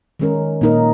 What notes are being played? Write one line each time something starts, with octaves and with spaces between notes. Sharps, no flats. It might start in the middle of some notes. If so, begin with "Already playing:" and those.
D#3 G#3 C#4 A#4
A#2 A#3 D#4 A#4